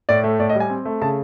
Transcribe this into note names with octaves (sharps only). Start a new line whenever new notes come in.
A2 D5
A3
A2 D5
D#5
G3 G#5
C4
A3
C#3 A5